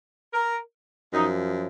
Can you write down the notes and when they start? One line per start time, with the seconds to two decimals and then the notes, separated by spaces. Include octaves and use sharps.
0.33 A#4
1.13 F#2 F3 D#4